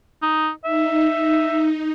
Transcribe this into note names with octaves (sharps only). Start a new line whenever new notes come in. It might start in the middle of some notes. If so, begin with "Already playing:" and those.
D#4
D#4 E5